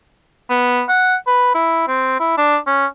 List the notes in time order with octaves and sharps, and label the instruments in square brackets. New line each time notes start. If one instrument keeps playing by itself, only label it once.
[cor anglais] B3
F#5
B4
E4
C4
E4
D4
C#4